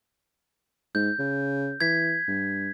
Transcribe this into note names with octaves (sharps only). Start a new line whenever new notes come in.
G#2 G6
C#3
E3 G#6 B6
G2